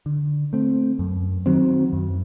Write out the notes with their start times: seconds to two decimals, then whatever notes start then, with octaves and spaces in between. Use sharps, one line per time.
0.06 D3
0.53 A3 C4
0.99 F#2
1.46 D#3 F#3 C4
1.93 F#2